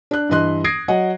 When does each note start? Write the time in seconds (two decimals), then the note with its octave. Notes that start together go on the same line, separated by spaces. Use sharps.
0.11 D4 F#6
0.29 G2 E3 D#5 C6 F#6
0.64 D#6 G#6 A#6 C7 D7
0.88 F#3 D#5 F#5